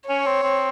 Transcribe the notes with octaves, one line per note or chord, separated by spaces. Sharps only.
C#4 C#5
C4
C4